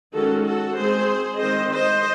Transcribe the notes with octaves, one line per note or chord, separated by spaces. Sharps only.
D#3 G#3 C#4 F#4 A4
F#4 A4
D#3 G#3 C4 G#4 C5
D#3 G#3 C4 C5 D#5
C5 D#5